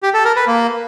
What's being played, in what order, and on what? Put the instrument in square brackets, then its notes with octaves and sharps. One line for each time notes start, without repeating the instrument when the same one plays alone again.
[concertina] G4
A4
A#4
B4
A#3